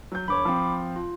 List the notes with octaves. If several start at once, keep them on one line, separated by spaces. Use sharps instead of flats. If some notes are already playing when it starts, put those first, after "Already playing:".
F#3 G6
E1 C#5 B5 D6
F3 C4
F4